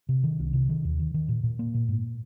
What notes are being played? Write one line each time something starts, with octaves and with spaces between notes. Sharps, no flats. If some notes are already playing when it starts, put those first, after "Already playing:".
C3
D#3
C2
C3
D#3
D#2
D#3
D#3
A#2
A#2
A#3
A#2
G#2